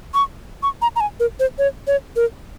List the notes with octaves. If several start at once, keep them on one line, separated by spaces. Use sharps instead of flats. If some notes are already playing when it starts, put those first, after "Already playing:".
C#6
C#6
A#5
A#5
G#5
A#4
C5
C#5
C#5
A#4